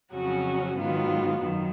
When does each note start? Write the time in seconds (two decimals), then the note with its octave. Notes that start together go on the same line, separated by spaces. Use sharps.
0.13 F2 C#3 F#3 C#4 F#4
0.76 G#2 D#3 F#3 B3 F4
1.40 F#2 D#3